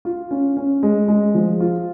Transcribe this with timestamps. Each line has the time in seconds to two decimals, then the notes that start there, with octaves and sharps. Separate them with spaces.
0.05 F4
0.31 C#4
0.57 C#4
0.83 G#3
1.08 G#3
1.34 F3
1.60 F4